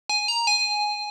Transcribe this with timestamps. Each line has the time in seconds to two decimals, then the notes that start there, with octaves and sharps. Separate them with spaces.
0.09 G#5
0.28 A#5
0.47 G#5